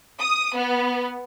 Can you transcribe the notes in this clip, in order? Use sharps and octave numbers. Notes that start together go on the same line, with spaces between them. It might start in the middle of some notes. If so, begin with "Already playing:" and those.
D#6
B3